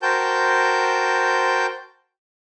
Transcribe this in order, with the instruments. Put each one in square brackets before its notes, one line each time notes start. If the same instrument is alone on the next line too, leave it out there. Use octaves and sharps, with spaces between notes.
[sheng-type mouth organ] F#4 A#4 C5 G5 A5 G6